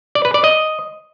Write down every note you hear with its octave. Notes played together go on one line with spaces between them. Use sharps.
D5
B4
D5
D#5